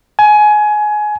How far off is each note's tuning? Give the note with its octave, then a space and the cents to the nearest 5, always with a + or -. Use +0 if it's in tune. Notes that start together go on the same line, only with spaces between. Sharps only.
G#5 +20